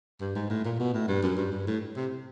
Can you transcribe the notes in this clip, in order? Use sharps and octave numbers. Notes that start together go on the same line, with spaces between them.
G2
G#2
A2
A#2
B2
A2
G2
F#2
G2
G2
A2
C3